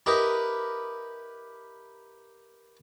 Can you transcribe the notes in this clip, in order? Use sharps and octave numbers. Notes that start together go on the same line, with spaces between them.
E4 G4 A#4 B4 D#5